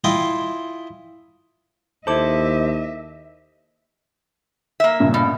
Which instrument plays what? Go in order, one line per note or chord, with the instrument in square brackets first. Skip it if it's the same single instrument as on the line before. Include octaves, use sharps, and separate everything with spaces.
[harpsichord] E4 F4 D#5 G5 G#5 C6
[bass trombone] D#2 [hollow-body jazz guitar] E4 A4 [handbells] C5 D6 [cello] D#5 E5
[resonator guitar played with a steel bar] A#3 E5
[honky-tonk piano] G2 A#2 C#3
[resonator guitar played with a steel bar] B2